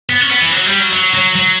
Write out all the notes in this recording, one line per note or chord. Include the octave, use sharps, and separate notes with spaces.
B3
C#4
B3
E3
F#3
G3
F#3
F#3
F#3
F#3